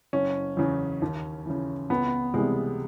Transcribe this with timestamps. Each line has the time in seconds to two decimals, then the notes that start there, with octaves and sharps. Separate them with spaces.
0.13 F#1 C#4
0.57 E2 C#3
1.02 D#2
1.46 C#3 E3
1.90 C#2 B3
2.34 C3 E3 G3 G#3